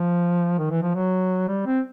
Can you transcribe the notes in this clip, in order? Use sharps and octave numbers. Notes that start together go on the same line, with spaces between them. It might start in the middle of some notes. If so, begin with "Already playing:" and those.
Already playing: F3
D#3
E3
F3
F#3
G3
C4